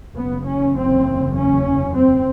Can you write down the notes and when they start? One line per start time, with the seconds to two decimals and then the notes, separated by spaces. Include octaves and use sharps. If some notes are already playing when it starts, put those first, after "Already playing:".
0.17 F#1 E2 C#3 B3
0.47 C#4
0.77 C4
1.37 C#4
1.96 C4